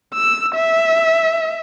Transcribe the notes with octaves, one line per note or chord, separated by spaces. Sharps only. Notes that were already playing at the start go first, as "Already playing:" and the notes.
E6
E5